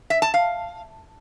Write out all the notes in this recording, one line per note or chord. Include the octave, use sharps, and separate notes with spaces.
E5
A5
F5